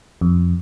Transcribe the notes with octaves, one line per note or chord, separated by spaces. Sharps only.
F2